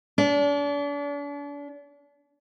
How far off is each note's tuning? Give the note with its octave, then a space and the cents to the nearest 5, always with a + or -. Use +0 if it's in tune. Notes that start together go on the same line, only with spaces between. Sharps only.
D4 -40